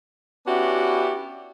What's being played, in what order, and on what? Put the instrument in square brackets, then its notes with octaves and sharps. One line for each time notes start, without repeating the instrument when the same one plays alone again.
[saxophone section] B3 C#4 D4 E4 F#4 G4